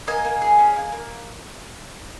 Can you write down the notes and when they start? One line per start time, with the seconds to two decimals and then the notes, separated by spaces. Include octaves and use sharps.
0.07 A#3 D#5 G#5
0.25 A#3
0.42 G#4
0.59 C#4
0.76 A#3
0.92 A#3